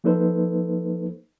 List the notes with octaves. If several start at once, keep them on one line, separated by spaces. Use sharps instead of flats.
F3 A#3 D#4 A4 B4 C5